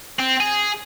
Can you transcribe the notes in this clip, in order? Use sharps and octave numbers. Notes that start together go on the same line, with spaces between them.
C4
G#4